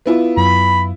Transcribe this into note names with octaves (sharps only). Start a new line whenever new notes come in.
B3 E4 F4
F#2 F#3 B5